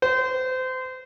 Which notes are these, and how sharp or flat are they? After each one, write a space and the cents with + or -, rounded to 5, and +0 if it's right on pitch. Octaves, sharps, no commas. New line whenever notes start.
C5 -30